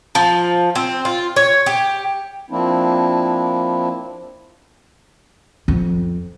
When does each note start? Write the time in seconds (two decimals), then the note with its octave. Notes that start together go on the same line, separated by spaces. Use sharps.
0.15 F3
0.75 C4
1.05 F4
1.36 C#5
1.66 G4
2.50 F3 A#3 C4 D4 E4
5.68 F2